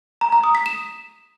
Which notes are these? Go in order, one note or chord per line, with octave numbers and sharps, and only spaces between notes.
A#5
A#5
D#6
B6
E7